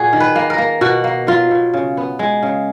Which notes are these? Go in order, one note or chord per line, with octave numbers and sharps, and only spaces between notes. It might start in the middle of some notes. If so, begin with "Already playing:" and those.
Already playing: A#2 F#4 G#4
D#3
B4
A#3
A#4
A#3
B2 F#4
A#3
F#3 F4
B2
C#3
B3
G#3
C#3